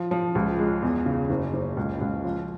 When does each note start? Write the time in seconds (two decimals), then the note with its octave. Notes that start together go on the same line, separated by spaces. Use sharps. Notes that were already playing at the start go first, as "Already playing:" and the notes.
Already playing: F3
0.11 F3
0.35 C#2
0.59 G#3
0.82 E2
1.06 C#3
1.30 F#1
1.53 F#1
1.77 C#2
2.01 C#2
2.24 F3